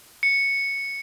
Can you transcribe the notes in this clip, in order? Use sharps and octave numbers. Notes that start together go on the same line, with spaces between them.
C#7